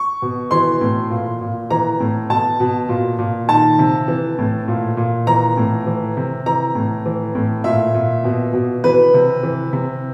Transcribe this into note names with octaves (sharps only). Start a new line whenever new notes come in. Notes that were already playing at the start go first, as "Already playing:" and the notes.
Already playing: C#6
B2
E3 C6
A2
A#2
A#2
E3 A#5
A2
B2 A5
B2
A#2
A#2
D#3 A5
C3
E3
A2
A#2
A#2
E3 A#5
A2
E3
C3
E3 A#5
A2
E3
A2
A#2 E5
A#2
B2
B2
E3 B4
C3
E3
C3